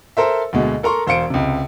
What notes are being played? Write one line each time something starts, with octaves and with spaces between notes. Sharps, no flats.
A4 A#4 C5 E5
D2 B2 G#3
A4 A#4 A#5 C6 C#6
E1 C5 F5 C#7 D7
C#2 C3